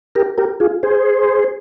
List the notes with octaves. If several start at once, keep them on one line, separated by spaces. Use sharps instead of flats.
G4 A#4
G4 A#4
F4 G#4
G#4 C5